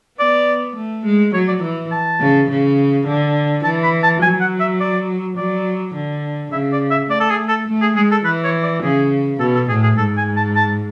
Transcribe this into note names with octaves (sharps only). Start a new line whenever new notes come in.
B3 D5
A3
G#3
F#3 C#5
D5
E3
A5
C#3
C#3
D3
E3 A5
B5
A5
F#3 G#5
F#5
E5
D5
F#3 D5
D3
C#3 E5
D5
E5
A3 D5
A4
G#4
A4
A3
G#4
G#3 G#4
A4
E3 B4
C#5
D5
C#3 G#4
B2 A4
A4
A2 G#4
G#4
G#2 A4
G#5
A5
A5